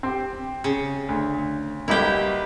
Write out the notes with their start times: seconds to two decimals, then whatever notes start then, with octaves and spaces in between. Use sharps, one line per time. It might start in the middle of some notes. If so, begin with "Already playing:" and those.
0.03 C4 G4
0.64 C#3
1.09 D2
1.88 B1 G3 A#3 E4 G4